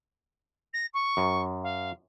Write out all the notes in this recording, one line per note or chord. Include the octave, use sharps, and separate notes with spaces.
A#6
C#6
F#2
F5